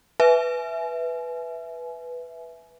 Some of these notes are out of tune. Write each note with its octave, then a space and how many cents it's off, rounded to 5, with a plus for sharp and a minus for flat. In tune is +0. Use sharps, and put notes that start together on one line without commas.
B4 +0 E5 +0 G#5 +30